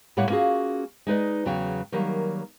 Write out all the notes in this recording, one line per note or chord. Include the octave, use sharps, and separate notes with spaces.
A2 G3 A#3 C#5 F#5
A#3 C#4 F4 F#4 G#4
G#3 D#4 B4 D5
E2 C#3 F#3 G5
D#3 F#3 G3 A#3